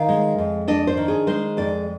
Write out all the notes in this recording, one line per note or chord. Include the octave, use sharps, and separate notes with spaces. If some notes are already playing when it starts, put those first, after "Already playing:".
Already playing: D#3 F5
G#3
F2
D4 D#5
C5
D#3
G#4
G#3 C5
F2 D5